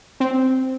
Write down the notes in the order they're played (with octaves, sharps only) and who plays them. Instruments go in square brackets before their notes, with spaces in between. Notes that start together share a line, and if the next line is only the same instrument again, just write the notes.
[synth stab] C4